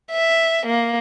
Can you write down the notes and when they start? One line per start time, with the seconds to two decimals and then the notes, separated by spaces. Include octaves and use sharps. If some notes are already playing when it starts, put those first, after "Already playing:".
0.12 E5
0.67 A#3